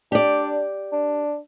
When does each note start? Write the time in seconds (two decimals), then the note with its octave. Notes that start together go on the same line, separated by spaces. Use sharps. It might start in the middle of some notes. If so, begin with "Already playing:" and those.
0.12 D4 G4 D5
0.92 D4